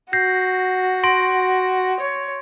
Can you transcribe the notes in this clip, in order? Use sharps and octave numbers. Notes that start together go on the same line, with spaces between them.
F#4 G6 A#6 C7
C6 A#6 D7
C#5